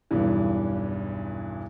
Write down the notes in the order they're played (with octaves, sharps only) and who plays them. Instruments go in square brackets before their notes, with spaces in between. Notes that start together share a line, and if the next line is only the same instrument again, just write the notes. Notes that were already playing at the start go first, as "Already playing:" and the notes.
[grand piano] B1 E2 G2 E3